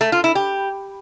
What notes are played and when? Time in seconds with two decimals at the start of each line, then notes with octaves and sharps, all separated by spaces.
0.01 A3
0.12 F4
0.24 E4
0.35 G4